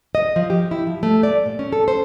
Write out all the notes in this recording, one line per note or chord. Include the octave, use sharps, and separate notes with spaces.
D#5
F3
G4
E4
F3
A3
D5
A#2
C#4
A4
C5